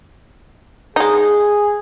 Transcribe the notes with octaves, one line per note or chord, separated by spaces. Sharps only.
G#3 D#4 G#4